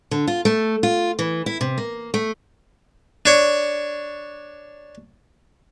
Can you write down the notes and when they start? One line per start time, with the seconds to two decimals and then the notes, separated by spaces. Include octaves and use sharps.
0.11 D3
0.27 F4
0.45 A3
0.83 F4
1.19 E3
1.46 E4
1.61 C3
1.78 A#3
2.14 A3
3.26 D4 C#5